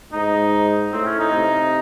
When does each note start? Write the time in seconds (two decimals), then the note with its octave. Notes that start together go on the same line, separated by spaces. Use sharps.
0.12 G#2 D#4
0.92 A2 C4
1.05 C#4
1.19 D#4
1.32 C3